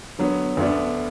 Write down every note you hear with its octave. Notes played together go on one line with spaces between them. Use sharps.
D3 F#3 B3
D2 D3 B3 D4